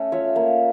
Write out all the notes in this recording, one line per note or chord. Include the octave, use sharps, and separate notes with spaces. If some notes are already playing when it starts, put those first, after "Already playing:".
Already playing: A3 C#4 A4
F4 C#5 E5
A#3